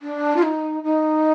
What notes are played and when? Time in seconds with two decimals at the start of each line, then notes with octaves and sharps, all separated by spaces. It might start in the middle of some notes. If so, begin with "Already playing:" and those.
0.02 D4
0.37 F4
0.43 D#4
0.83 D#4